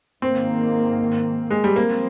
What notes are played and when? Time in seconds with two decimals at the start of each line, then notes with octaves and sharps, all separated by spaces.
0.22 G#2 D#3 A#3 C4
1.51 G#3
1.64 G3
1.76 F3 A#3 C4